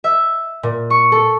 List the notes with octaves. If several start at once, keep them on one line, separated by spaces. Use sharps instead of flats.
E5
A#2
C#6
A4